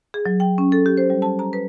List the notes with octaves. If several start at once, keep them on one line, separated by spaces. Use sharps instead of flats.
G#4
F#3
G5
C#4
A4
G4
C5
G3
A5
A#5
B4